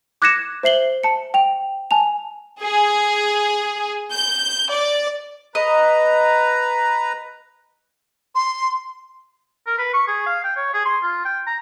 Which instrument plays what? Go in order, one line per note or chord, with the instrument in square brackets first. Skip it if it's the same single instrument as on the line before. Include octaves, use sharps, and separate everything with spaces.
[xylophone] D6 F#6 G#6 A#6 C#7 E7
C5 E5 C7 F#7 G7
A5 C#7
G5 F7
G#5 A5 F7
[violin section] G#4
G6
D5
[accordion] B4 A#5 [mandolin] D#5
[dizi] C6
[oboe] A#4
B4
C#6
G#4
F5
G5
C#5
G#4
C6
F4
G5
A#5